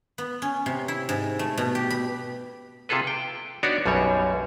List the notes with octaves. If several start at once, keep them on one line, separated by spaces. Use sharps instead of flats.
B3
C#4
C3
E4
G#2
A3
B2
G4
B5
C3 F4 G#4 A4 B4
G5
B3 D4 D#4 F#4 C#5 D5
B1 F#2 B2 G3 C#5